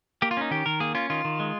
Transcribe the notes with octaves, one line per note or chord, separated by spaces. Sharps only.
A#3 G4
F4
C#4 D#4
D#3 G4
D#3 A#4
A#3 G#4
C#4 F4
D#3 F4
D#3
G#3